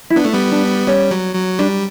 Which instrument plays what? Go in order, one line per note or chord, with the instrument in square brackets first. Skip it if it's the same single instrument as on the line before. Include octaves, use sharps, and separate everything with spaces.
[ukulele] E4
[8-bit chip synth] B3 [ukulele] D4
[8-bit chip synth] A3
G3 B3
[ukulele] D4
[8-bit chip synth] G3 [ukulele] C#4
[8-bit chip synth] F#3
F#3
[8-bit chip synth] G3 [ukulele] D4